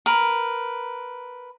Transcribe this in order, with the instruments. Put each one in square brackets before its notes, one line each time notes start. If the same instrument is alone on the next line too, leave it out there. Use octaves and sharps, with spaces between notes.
[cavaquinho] A#4 B4